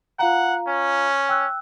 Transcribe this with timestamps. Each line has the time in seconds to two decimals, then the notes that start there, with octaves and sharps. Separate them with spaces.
0.19 F4 F5 F#5 A#5
0.67 C#4
1.29 G5 E6 F#6